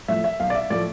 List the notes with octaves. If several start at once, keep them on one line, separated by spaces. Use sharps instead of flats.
A2 F3 A3 E5
E5
B1 F5
D5
E5
A2 F3 A3 D5